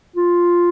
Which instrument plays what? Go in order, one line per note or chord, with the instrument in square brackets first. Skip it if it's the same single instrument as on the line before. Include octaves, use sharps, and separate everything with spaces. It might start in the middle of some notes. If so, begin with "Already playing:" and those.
[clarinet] F4